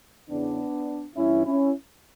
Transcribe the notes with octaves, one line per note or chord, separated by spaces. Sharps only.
E2 C#3 E3 B3 D4
G2 E3 C#4 E4
C#4 E4